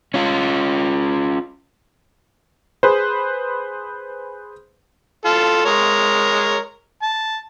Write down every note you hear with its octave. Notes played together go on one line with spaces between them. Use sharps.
C#4 F4
G#4 B4 C5
F4 A4
G#3 A#4 C#5
A5